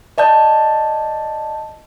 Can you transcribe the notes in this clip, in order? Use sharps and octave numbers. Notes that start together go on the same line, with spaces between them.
D5 D#5 A5 G6